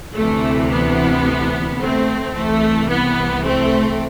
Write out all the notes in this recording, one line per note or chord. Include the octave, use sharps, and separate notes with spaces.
D2 C3 E3 A3
B3
A3 C4
C2 C3 E3 A3
B3
A3 C4